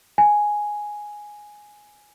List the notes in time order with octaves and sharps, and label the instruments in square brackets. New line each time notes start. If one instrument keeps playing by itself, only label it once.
[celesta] G#5